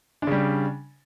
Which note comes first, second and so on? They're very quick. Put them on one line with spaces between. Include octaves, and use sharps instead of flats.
D4 C#3 G3